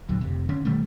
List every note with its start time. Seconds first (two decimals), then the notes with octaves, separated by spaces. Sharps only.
0.09 A#1 D#2 D3 F#3
0.21 F1 C3
0.49 D3 C#4
0.65 B2 D#3 G3 A3